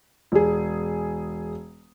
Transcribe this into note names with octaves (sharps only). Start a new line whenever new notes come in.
E1 G#4